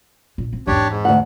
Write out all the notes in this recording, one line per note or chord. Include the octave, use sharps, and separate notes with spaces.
A#2
C4
G#1 E2 D4 G4 C#5
G#2
D2 F#5